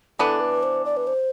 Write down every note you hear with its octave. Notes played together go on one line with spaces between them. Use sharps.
E3 B3 D4 A4
B4
C5
D5
B4
C5